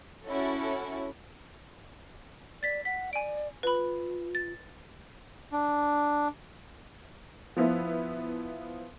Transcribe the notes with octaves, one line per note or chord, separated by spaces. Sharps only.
C#4 E4 F#4 A4 C#5
D5 A6 B6
F#5 B6
D5 G#5 D7
F4 B4 B5
A6
D4
F3 B3 E4